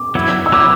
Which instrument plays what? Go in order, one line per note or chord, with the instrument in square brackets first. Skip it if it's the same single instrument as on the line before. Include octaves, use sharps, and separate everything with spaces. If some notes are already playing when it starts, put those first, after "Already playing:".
Already playing: [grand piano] D6
[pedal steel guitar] F#3 B3 E4
[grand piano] E6
[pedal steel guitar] F#3 B3 E4 [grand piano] D6